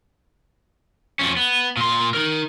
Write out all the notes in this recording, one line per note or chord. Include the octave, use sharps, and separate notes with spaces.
F2 C#4
B3
A#2 C6
D#4 A#4